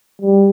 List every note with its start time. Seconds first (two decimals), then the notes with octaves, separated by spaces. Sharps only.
0.22 G3